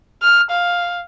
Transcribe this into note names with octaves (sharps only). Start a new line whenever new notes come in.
F6
F5